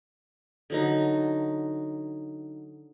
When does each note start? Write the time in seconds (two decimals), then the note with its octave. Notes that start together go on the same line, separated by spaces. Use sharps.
0.70 D3 F#3 D#4